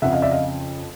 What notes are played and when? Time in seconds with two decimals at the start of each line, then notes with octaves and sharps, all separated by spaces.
0.02 F2 C#3 F3 E5 F#5
0.12 D#5 F5
0.22 D5 E5
0.31 D#5 F5